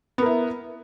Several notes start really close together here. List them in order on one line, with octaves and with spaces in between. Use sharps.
B3 A#4 E4